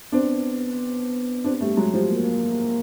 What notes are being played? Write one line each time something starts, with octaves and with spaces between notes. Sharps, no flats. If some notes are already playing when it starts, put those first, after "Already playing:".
B3 C4 D4
C4 D4
G3 A3
F#3 G#3
F3 G3
A#3